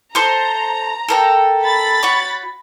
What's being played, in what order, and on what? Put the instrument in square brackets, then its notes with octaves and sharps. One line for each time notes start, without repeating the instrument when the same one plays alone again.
[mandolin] A4 C5 [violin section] A#5
[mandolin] A4 A#4 G5
[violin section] B5 A6
[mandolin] F#4 C#5